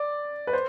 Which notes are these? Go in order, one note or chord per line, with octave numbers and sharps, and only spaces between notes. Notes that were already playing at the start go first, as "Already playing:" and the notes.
Already playing: D5
B4
C5